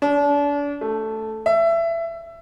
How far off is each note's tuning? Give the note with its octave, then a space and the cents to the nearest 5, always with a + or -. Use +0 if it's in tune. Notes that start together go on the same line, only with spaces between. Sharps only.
D4 -35
A3 +0
E5 +20